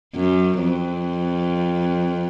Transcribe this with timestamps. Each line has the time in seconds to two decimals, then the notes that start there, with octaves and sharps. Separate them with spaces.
0.15 F#2
0.60 F2